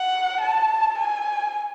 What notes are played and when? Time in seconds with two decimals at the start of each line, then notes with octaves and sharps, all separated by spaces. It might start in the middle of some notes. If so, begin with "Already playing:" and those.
Already playing: F#5
0.41 A5
0.98 G#5